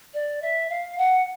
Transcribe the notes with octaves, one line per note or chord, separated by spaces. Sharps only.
D5
E5
F5
F#5